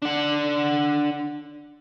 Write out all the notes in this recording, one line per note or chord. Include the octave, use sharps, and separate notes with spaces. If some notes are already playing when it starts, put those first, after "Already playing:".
D4 F#5